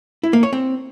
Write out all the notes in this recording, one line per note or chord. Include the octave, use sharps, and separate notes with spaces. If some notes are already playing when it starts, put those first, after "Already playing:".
E4
A#3
C#5
C4